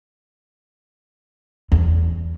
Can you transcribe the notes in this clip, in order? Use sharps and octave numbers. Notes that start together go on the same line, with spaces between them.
E2